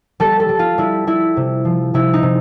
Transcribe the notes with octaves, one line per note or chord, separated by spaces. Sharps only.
G3 A4
A4
G3
F4
G3 E4
G3 E4
C3
F3
C3 E4
D#4
C3